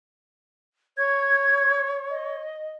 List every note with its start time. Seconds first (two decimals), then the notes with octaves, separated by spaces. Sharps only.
0.97 C#5 G#6
2.10 D#5